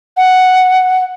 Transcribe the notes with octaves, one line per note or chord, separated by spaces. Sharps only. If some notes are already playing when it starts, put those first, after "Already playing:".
F#5